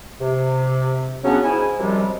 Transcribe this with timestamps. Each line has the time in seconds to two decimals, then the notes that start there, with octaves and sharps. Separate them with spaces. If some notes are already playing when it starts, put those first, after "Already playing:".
0.21 C3
1.24 C#3 F#3 B3 C#4 D4 F#4
1.44 G#2 E4 G#5
1.78 F#2 C3 F3 G3 G#3